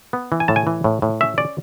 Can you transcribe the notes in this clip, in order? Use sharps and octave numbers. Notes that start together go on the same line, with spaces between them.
B3
E3
G#5
A2 A5
G#5
E3
A2
A2
C#4 E5
C#4 D5